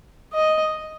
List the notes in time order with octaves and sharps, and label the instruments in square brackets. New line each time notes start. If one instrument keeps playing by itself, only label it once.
[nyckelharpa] D#5